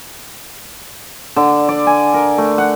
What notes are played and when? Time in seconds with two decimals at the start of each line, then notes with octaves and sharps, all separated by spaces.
1.36 D3
1.69 D5
1.87 G#5
2.14 A#4
2.38 A3
2.58 F#5